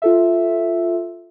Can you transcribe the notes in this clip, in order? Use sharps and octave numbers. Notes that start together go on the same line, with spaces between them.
F4 A4 E5